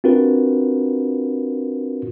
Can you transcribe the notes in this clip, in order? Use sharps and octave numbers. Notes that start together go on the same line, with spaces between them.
C4 D4 F4 F#4 A#4 B4